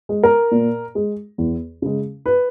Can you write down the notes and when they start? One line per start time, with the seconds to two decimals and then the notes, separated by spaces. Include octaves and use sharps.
0.09 G#3
0.23 A#4
0.52 A#2
0.95 G#3
1.38 E2
1.82 C#3 G#3
2.26 B4